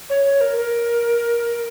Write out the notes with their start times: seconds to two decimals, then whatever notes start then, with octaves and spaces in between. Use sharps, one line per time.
0.10 C#5
0.25 C#5
0.41 A#4
0.57 A#4